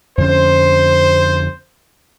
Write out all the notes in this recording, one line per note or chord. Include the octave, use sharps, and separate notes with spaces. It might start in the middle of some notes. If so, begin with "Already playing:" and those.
F2 D3 C#4 C5